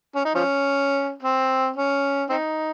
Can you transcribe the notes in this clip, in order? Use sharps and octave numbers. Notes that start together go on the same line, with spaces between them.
C#4
D#4
F3 C#4
C4
C#4
C4 D#4